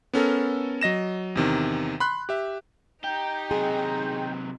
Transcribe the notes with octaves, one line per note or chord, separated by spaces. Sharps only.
B3 C#4 A4 A#4
F#3 D#5 A#6 E7
E2 C3 D#3
B5 C6 F#6
G4 E5
D#4 G4 G5
C3 F#3 G#4